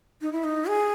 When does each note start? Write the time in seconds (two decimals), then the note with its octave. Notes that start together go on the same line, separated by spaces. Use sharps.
0.21 D#4
0.32 E4
0.44 D#4
0.68 G#4